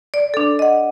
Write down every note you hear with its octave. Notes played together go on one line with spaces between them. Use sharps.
D5
D4 A4
D#5 F#5